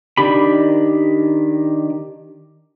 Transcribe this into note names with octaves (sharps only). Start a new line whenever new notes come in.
D#3 D4 G4 B5